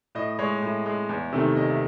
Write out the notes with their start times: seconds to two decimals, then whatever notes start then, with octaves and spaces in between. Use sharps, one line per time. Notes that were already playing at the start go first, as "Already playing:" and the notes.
0.15 A2 D#5
0.39 G#3 C#5
0.62 A2
0.86 G#3
1.09 E2
1.32 C3 D#3 A3
1.56 E2 D#5
1.70 E5